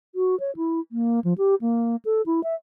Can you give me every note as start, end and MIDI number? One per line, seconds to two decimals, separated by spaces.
0.15 0.38 66
0.40 0.55 73
0.56 0.80 64
0.92 1.20 58
1.24 1.33 53
1.38 1.55 67
1.61 1.96 58
2.05 2.22 69
2.26 2.43 64
2.43 2.54 76